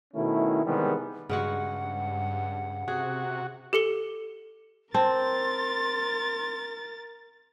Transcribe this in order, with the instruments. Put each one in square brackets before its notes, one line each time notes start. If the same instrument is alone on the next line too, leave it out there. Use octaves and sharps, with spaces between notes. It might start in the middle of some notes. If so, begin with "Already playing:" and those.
[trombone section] B2 D#3 A3 C#4 E4
C3 D#3 E3 G3 G#3 B3
[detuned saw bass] G2 [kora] C#3 G#3 F#4 [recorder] F#5
[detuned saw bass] C3 [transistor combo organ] F#4 [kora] G#4
[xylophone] G4 A4 C#7 G7
[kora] C4 [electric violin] A#4 A6 [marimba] A5 [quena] C6